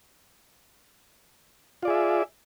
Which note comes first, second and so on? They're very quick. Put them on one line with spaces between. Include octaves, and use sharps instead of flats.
F4 D5 G#4 E5